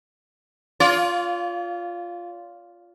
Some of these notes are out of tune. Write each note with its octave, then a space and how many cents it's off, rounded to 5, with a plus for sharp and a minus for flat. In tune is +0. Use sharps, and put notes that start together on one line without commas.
F4 +0 D5 -45